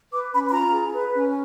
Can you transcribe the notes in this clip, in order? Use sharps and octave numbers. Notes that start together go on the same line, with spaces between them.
B4 D6
C#4 B5
B5
F4 A#5
G#4
B4
C#4